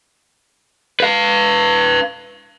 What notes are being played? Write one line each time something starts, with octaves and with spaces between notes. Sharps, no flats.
B4 F5